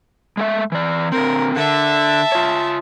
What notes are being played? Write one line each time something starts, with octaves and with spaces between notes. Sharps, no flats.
G#3 A3 E5
E3 D5
D3 C4 A#4
D3 E5 A5
F4 C#5